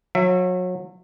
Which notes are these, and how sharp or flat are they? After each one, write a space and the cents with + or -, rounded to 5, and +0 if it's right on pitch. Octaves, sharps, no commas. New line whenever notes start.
F#3 -30 E5 +25